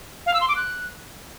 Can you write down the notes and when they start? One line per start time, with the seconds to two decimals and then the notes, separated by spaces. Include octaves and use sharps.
0.26 F5
0.34 E6
0.41 C6
0.48 D6
0.56 F#6